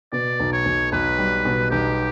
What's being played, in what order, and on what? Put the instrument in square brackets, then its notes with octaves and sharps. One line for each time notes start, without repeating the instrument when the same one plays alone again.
[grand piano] B2 [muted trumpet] D5
[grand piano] B1
[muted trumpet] C#5
[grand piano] B1
[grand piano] B1 [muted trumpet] B4
[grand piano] G3
B2
[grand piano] B1 [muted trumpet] G4